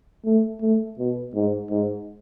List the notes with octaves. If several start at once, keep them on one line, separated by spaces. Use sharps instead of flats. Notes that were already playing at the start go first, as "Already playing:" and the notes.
A3
A3
B2
G#2
G#2